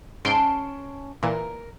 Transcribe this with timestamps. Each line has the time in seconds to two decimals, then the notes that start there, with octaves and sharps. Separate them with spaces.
0.25 G#2 C#4 A5 C6 D7
1.23 A#2 E3 A#4